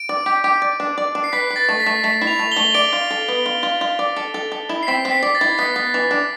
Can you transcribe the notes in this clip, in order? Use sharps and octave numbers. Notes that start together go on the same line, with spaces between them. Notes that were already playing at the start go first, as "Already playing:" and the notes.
Already playing: D7
D5
G4
G4
D5
D4
D5
D4
C7
B4 B6
B4
A6
A3
B6
A3
A3 B6
E4
F7
A3
A3 G7
D5 D7
F4
A4
B3
F4
F4
F4
D5
A4
A4
A4
E4
C7
C4 B6
C4
B6
D5
A6
E4
B3 B6
B3
E3
D4